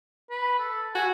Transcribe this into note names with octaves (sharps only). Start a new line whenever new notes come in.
B4
A4
F#4 G#5